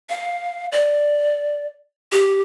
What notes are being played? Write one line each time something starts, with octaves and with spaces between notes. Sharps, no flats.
F5
D5
G4